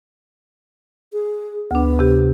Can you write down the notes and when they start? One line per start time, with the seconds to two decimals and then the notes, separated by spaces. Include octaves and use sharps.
1.13 G#4
1.71 D2 B3 D4
1.99 C3 G4